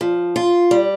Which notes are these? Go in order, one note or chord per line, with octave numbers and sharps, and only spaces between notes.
F3
F4
G3